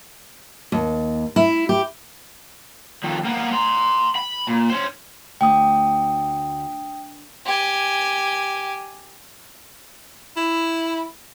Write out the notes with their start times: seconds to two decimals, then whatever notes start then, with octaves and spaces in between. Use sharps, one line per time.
0.72 D#2
1.36 E4
1.69 G4
3.04 F2 D#3
3.25 A#3 B3
3.53 A#5 C6
4.16 B5
4.47 A#2
4.70 C#4 C5
5.41 D2 G5 D#6
7.45 G4 G#5
10.36 E4